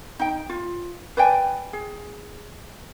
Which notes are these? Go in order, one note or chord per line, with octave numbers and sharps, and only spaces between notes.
D#4 G5
F4
B4 D5 G5 G#5
G#4